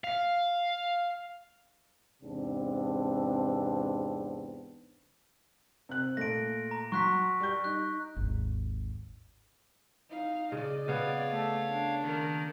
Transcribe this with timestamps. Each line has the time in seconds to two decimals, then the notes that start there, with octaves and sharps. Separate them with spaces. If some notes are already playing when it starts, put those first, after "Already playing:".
0.04 F5
2.23 E2 G#2 C3 B3 C4 D4
5.89 C3 F#6
6.17 A#2 A3 A#6 D7
6.71 A#5
6.92 F#3 A#5 C6 C#6 F#6 B6
7.40 G3 G6
7.64 D#4 F#6
8.16 G#1 D#2
10.10 D#4 F5
10.52 C#3 D5 D#5
10.88 C#3 B3 C#5 F5
11.31 A3
11.69 D4
12.02 D#3 A#3 A#4